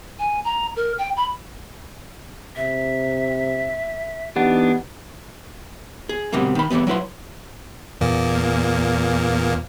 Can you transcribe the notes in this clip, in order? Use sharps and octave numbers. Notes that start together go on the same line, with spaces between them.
G#5
A#5
A#4
G5
B5
C3 E5
E3 B3 D4 D#4 G4 F#5
G#4
B2 D3 G3 A#3 C4
D#3 B5
D3 E3 F3 G3 B3
F#3 E4 B4 C6
E2 A#2 A#3